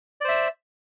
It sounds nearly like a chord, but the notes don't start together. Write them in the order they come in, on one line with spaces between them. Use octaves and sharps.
D5 C5 E5